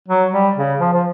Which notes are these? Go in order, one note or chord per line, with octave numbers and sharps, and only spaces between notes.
F#3
G3
C#3
F3
F3